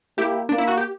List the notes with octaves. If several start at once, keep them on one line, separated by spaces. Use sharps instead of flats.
A#3 E4 G4
A#3 D4
E4
F#4
G4